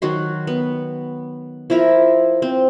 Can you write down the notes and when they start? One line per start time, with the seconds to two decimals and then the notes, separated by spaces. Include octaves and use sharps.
0.02 D#3 F#3 F#4 C6
0.47 B3
1.70 F3 E4 A#4 E5
2.42 C4